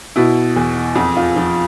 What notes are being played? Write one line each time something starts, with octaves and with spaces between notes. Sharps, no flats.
B2 E4
E2
F2
F4
F3